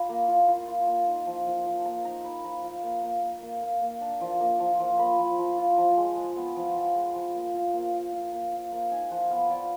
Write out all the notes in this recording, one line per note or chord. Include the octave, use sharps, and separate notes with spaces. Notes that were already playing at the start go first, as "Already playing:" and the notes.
Already playing: F4 B5
A#3
F4
F4
F4
A#3
D#4
F3
F3
F3
A#3 A#5
D#4 A#5
D#4 B5
F3 A#5
F4 A#5
A#3
A#3
A#3
A#3
A#3
A#3
D4
F3
A#3
F3
F3
A#3 B5
F3
F3
F4
F3 A#5
G#3
G#3
B3
F3
F3
G#3
F3
A#3
F4
A#3
F4
F4
A#3
F4
A#3
D#4 G#5
F3 F#5
B3 F5
F3 D5